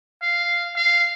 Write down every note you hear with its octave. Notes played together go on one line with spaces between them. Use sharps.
F5
F5